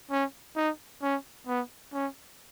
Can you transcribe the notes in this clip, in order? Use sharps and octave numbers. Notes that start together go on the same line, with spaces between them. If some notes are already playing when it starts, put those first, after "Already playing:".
C#4
D#4
C#4
B3
C#4